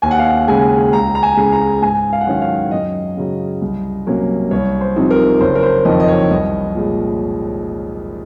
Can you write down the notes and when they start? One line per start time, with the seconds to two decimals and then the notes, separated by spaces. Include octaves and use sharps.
0.02 D#2 G#5
0.11 F#5
0.19 F5
0.27 F#5
0.48 C#3 G#3 G#5
0.93 C#2 A#5
1.15 A#5
1.23 G#5
1.37 C#3 G#3
1.52 A#5
1.82 G#2 G#5
2.13 F5
2.21 F#5
2.27 D#3 F#3 C#4 F5
2.42 F5
2.71 F#2 D#5
3.17 C#3 F#3
3.61 C2
4.07 C3 F#3 A#3 C#4
4.51 C2 C#5
4.81 C5
4.96 C3 F3 C4 D#4
5.11 A#4
5.41 F#1 C5
5.55 A#4
5.63 C5
5.85 F2 D#3 D#5
6.00 D#5
6.08 C#5
6.30 C2 D#5
6.75 A#2 G#3